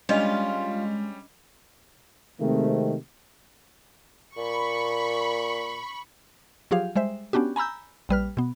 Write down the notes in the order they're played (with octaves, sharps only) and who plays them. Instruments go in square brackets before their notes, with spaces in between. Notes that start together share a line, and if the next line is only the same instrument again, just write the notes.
[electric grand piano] G3 C#4 [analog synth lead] G#3 [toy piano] D4 D#5 [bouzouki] F4
[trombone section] C3 D#3 G#3 A3 C4
[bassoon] A#2 [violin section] B5 C#6
[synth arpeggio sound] F3 F#3 F4 G4 G#4 F5
G3 G#3 C5 E5
B3 C#4 D4 F#4 G4
G#5 A#5 B5 E6 G6
A#1 G3 B4 F6
B2 B3